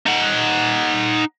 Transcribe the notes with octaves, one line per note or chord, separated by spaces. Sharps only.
D#4 F#5